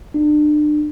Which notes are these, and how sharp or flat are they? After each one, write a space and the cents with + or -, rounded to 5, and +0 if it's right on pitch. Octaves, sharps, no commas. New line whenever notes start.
D4 +35